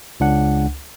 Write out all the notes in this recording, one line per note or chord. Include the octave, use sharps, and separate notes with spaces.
C#2 D4 F#5